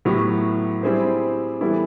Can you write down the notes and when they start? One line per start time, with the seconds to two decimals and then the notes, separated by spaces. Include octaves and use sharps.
0.05 A2 F#3 B3 E4 G4
0.83 G3 C4 E4 G#4 C5
1.61 E3 G3 B3 E4 A4